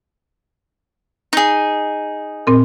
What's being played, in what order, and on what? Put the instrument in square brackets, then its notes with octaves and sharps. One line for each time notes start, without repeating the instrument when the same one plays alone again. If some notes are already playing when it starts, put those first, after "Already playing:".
[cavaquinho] D#4 G#4
[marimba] A#2 C4 A#4